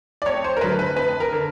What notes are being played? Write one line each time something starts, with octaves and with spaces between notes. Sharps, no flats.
D5
F2 C#5
C5
A#4
D3 F#3 B4
B4
F2 B4
A#4
D3